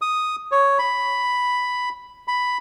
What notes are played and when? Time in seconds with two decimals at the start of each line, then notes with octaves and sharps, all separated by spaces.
0.02 D#6
0.52 C#5
0.79 B5
2.28 B5